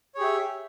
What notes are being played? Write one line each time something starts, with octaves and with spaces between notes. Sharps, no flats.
G4 G#4 C#5 E5